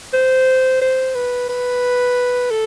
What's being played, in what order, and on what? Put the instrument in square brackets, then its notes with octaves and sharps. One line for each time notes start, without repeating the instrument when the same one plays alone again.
[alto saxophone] C5
C5
B4
B4
A4